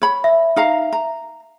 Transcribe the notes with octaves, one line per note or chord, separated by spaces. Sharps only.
C#5 B5
E5
D#4 F5 A#5
A#5